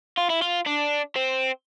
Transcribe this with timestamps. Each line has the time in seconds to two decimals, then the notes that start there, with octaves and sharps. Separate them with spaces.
0.17 F4
0.30 E4
0.42 F4
0.66 D4
1.16 C4